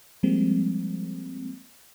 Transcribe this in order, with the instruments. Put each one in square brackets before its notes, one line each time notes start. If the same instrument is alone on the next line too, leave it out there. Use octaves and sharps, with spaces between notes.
[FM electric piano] F3 G3 G#3 A#3 C4